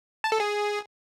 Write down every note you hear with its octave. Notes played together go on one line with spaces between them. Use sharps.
A5
A4
G#4